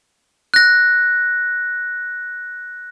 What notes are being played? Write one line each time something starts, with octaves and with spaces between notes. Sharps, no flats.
F#6 A#6